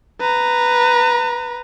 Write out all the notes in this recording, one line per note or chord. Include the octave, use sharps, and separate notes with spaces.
B4 A#5